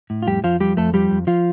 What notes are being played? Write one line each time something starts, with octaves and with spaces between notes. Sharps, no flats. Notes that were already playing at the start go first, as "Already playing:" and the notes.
A2
F4
F2 G3 G4
F2 F3 F4
F3 G3 G4
F2 A3 A4
F3 G3 G4
F2
F3 F4